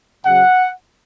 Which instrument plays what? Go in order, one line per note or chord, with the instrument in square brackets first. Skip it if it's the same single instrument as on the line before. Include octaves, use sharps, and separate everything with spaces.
[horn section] C#3 F#3 F#5